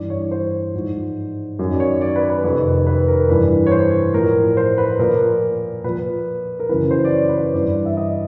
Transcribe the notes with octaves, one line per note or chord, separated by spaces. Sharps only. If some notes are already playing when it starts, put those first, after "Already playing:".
Already playing: G2 E3 D5
C#5
C5
G#2 F3
F#2 D#3
D5
C#5
D5
B4
B4
F2 C3 D#3
B4
A#4
G2 E3 B4
C#5
C5
A2 F3 A#4
C5
B4
A#2 F3 A#4
A#2 F3 B4
A#4
F#2 C#3 E3 B4
C5
D5
C#5
B4
C5
C#5
G2 E3 D5
E5
D#5